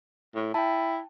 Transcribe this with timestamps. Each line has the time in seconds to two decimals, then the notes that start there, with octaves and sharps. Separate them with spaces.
0.35 A2
0.54 E4 G5 A5